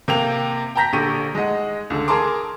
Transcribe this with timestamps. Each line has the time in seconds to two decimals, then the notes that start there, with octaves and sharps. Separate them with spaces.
0.08 C3 A#3 G5 F7
0.75 G5 A5 A#5 G6 A#6 B6
0.93 A#1 D3 G4 C#6 D#7
1.35 G#3 D#4 D#5 F#5
1.90 C#2 D3
2.08 G#4 A#4 A5 A#5 C6 D6